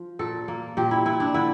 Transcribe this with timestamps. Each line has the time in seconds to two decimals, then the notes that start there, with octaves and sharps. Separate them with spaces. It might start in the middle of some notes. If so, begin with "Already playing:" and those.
Already playing: F3
0.19 A#2 A4
0.48 A#3
0.77 A#2 G4
0.91 E4
1.05 A#2 E4
1.20 D4
1.34 D3 E4